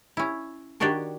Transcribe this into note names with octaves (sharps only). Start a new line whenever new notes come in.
C#4 E4
D#3 D4 F#4 G4 C#5 D5